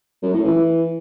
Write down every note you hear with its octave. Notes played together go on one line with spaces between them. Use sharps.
F#2
A2
E3